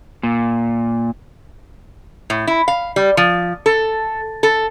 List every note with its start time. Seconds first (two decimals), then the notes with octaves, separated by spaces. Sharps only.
0.23 A#2
2.30 A2
2.47 E4
2.68 F5
2.96 G3
3.17 F3
3.66 A4
4.43 A4